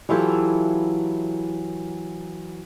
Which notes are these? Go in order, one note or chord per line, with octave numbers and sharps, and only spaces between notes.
E3 F#3 E4 F4 G4 A4